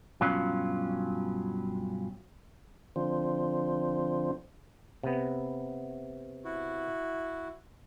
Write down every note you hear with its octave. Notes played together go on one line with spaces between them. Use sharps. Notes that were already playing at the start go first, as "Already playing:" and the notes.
G2 B2 F#3 C#4 F4
D3 F3 C4
C3 B3
E4 F#4